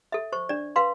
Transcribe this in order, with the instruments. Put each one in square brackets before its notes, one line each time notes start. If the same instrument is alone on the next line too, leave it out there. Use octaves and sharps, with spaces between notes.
[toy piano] A4 E5
C5 C#6
D4 D5
B4 F5 C6